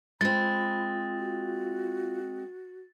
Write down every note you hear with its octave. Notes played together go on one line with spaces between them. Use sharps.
G#3 C4 F4 B5 A6
F#4